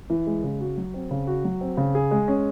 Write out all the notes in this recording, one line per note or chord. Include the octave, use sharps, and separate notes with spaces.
E3
G#3
C#3
F#4
F#3
C4
C#3
F#4
F#3
C4
C#3
G#4
G#3
C#4